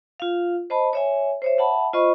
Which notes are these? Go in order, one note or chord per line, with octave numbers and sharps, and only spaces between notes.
F4 F5
C5 D#5 A5 B5
C#5 E5 G#5
C5 C#5 E5
E5 F#5 A5 B5
F4 C5 D#5 B5 C#6